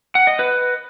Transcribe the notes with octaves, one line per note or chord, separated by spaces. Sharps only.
F#5
D#5
B4